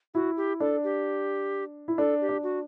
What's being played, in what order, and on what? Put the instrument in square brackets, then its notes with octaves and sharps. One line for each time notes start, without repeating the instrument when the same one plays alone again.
[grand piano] E4 [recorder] F#4
[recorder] G4
[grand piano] D4 [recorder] A4
[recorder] G4
[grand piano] E4
[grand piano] D4 [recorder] A4
[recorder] G4
[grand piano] D4
[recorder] F#4